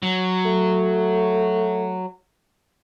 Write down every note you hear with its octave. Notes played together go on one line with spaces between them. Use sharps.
F#3
A3